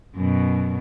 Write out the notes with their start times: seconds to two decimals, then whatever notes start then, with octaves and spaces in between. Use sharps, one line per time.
0.16 F#2 B2